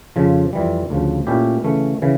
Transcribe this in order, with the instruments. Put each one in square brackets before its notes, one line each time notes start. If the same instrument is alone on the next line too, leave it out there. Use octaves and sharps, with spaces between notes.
[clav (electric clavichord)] F2 C#3 F3
F2 E3 G3
D2 C#3 F3
A#2 A3 C#4 E4 G4
C#3 E3 A3 C#4
C#3 E3